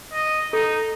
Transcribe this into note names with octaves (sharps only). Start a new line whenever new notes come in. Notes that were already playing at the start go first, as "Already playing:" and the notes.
D#5
D#4 A4